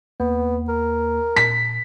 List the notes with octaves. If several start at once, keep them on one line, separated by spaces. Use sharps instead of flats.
D#2 A#3 B3
A#4
A#2 B6